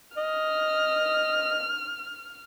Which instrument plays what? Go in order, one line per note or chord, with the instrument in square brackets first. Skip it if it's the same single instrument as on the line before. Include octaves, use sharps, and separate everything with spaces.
[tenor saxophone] D#5 [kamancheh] F6